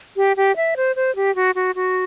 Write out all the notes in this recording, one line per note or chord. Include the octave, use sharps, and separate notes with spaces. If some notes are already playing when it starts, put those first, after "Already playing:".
G4
G4
E5
C5
C5
G4
F#4
F#4
F#4